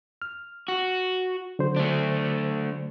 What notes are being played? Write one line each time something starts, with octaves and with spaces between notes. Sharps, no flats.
F6
F#4
D3 F#3 C5
A3 D4